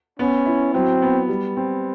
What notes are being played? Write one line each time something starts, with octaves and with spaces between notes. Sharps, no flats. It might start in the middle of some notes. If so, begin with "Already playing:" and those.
B3 C#4
E4
F#3 C4
B3
G3
C4